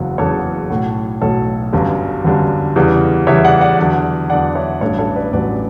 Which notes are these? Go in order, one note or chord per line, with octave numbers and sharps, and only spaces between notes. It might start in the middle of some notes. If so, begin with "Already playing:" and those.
Already playing: F#1 E2 C#3 F#3
F#1 E2 C#3 F#3 A4 C#5
B1 A2 F#3 F#4 A4
B1 A2 F#3 A4 C#5
G1 F#2 D3 G3
G1 F#2 D3 G3
E2 C#3 E3 G3
E2 C#3 E3 G3 C#5 E5
D5 F#5
D5 F#5
E2 D3 F#3
E2 D3 F#3 D5 F#5
C#5 E5
A1 G2 F#3 A4 C#5
A4 C#5
B4 D5
A1 G2 F#3 B4 D5